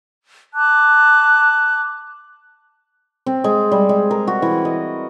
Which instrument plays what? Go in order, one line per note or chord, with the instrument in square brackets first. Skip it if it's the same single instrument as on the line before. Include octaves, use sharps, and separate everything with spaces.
[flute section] A5 D6 F#6
[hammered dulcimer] C4
G#3
G3
G#3
A#4
F#4
E3
D#5